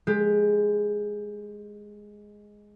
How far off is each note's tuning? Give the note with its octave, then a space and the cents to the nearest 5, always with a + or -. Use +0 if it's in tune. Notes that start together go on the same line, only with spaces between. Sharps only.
G#3 +0 G4 +20